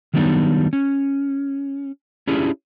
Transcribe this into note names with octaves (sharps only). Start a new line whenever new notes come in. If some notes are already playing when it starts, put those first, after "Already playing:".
D#3 F#3 G3 B3 D4 D#4
C#4
C#4 D4 E4 F4 G4 G#4